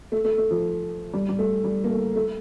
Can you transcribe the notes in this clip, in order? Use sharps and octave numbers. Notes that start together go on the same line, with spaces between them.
A3
A3
A3
F3
G3
G3
A3
G3
A#3
A3
A3